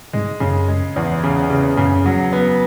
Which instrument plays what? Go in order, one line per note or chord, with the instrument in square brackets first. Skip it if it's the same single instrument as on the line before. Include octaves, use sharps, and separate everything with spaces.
[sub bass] G#2 [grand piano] G#3
[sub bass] F#2 [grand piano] C#3
[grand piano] G#3
E2
C#3
C#3
[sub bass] F#2 [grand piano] C#3
[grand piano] F#3
B3